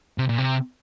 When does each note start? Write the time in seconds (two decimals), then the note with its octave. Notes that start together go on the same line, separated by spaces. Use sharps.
0.18 C3
0.29 A#2
0.38 C3